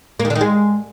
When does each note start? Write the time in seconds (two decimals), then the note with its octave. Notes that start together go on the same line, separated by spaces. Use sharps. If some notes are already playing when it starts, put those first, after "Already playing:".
0.20 A#3
0.25 D#3
0.30 D3
0.36 D#3
0.41 G#3